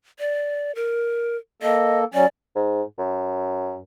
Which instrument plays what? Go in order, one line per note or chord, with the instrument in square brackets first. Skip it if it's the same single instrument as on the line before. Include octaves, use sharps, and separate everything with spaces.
[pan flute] D5
A#4
[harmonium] A#3 A4 [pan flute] D#5
[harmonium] F#3 C#4 [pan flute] D5
[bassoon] G#2
F#2